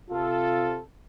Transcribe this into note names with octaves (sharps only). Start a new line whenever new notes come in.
C3 F4 A4